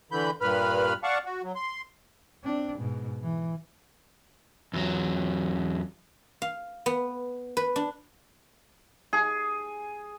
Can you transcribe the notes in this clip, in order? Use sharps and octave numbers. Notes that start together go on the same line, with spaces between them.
D3 E3 B5 G6
G2 A#2 B4 B5 F6
D5 F5 F#5 A5 C#6
F#4
F#3
C6
C4 D4
G#2 B2
E3
E2 F#3
F5
B3
B4
D4
G#4